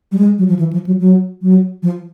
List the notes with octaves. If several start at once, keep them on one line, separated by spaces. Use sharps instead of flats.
G3
G#3
F#3
F3
E3
F3
F#3
F#3
F#3
F3